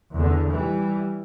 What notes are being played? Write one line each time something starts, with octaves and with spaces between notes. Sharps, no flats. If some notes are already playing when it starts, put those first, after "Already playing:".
E2 D3
E3 G3